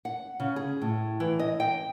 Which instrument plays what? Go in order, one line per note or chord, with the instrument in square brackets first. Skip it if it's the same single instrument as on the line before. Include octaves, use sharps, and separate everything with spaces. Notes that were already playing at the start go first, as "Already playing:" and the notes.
[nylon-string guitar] F#5
C#3
G#4
A2
E3
D#5
G5